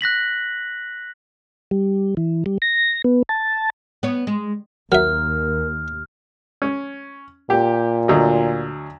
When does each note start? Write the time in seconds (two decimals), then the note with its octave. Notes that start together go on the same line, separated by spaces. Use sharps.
0.01 F#6 A#6 B6 F#7
1.71 G3
2.17 E3
2.46 G3
2.62 A#6
3.04 B3
3.29 A5
4.03 B3 C#5
4.27 G#3
4.92 D#2 F#3 A#4 E5 F6
6.62 C#4
7.50 A#2 G4
8.08 D2 F#3 D#5